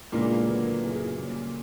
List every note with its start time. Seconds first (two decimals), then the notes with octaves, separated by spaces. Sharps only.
0.12 C#2 A#2 C#3 E3 A#3 B3 D4
0.46 D3 F#3 B3 D4 A#4
0.81 F#2 C#3 F#3 B3 E4
1.16 C#3 G3 A#3 C#4